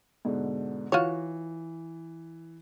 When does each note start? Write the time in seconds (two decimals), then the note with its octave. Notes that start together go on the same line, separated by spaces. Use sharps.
0.25 G#2 B2 D3
0.92 E3 F4 F#4 C#5